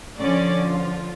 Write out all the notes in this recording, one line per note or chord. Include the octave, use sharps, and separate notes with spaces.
D3 F3 C#4 D5
F4